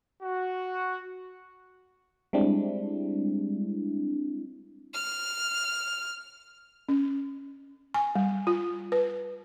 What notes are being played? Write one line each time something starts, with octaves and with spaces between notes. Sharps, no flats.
F#4
G3 G#3 C4 D4 E4
F6
C#4
G#5
G3
F4
B4